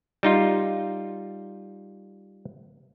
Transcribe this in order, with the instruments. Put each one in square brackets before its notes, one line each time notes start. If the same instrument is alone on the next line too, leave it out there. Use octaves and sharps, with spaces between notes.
[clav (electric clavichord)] G3 D#4 F4